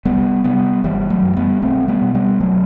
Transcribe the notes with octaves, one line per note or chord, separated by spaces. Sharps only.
C2 G3 B3
C3 G3 B3
G1 E3 G3
F#3 A3
F#2
G3 B3
B1 A3 C4
G3 B3
B2
G3 B3
B1 F#3 A3